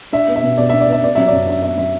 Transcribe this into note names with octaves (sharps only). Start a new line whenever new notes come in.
D4 E5
B3
E5
B2
B2 D5
D4 E5
D5
B3 E5
B3 D5
F#3 E5
D5
F#2
D4 E5
B3 E5
F#3 E5